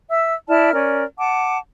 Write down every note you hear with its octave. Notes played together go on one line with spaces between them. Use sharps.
E5 E6
E4 D5 A5 F6
C#4 A#4 D5
F#5 A5 D6